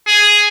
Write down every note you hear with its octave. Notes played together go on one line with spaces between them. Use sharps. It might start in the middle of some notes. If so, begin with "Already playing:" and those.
G#4